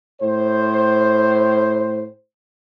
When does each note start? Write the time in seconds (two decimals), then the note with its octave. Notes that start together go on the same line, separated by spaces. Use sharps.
0.20 A2 C5